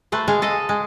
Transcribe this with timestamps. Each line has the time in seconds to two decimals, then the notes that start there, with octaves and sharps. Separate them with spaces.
0.12 A3 B4 C5
0.28 G#3 G#4 F5
0.42 A4 D#5
0.69 G#3